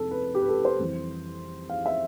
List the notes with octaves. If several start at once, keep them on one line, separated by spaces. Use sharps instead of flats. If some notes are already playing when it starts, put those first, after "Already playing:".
Already playing: F2 C3 A4
B4
G4
B4
A4
C5
F2 E3 G3
F5
E5